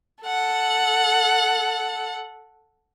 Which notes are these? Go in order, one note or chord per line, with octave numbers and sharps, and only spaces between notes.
A4 F#5